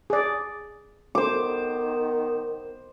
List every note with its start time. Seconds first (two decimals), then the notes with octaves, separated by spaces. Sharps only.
0.10 G#4 D5
1.15 D#3 B3 C5 D6